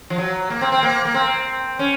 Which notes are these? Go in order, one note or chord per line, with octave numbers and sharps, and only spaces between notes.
F3
F#3
A#3
C4
C4
A#3
A#3
C4
C#4